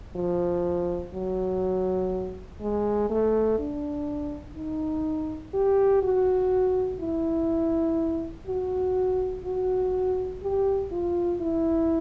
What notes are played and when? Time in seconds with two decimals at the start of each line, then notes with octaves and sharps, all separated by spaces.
0.16 F3
1.14 F#3
2.61 G#3
3.10 A3
3.59 D4
4.56 D#4
5.54 G4
6.03 F#4
7.01 E4
8.47 F#4
9.45 F#4
10.43 G4
10.92 F4
11.41 E4